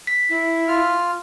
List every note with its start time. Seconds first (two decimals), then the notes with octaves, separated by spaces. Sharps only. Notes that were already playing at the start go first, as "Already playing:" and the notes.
0.07 B6
0.29 E4
0.68 F4 F6